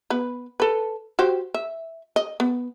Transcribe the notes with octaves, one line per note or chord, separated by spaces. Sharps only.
B3 B4
A4 B4
F#4 G4 C5
E5
D#5
B3